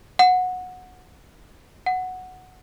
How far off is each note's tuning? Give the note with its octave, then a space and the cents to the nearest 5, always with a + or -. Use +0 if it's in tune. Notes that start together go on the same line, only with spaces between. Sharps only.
F#5 -15
F#5 -5